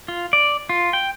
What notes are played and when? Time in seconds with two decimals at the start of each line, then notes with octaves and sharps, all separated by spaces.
0.08 F4
0.33 D5
0.69 F4
0.93 G5